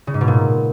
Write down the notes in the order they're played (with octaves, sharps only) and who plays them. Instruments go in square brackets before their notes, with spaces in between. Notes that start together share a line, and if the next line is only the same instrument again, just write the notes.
[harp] C#3
G#2
B2
A#2